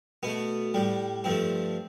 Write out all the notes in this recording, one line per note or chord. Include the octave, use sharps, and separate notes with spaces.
B2 A3 B3
A2 G3
G2 F3 A3 C4